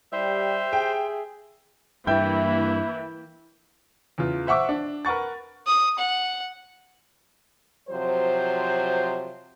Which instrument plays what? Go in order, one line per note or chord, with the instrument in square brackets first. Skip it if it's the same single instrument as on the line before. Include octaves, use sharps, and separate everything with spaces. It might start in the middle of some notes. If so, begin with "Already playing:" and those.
[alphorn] G3 [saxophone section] G4 E5 [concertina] C5
[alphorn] G#4 [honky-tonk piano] G5
[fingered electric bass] G2 [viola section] E3 A#3 [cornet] E4 [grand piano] E5 G5 G6
[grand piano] E2 C#3 F4
C5 E5 F#5 C#6 D6 E6
D4
A#4 B4 F#5 C#6 A6
[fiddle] D#6
F#5
[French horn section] C3 F3 F#3 C5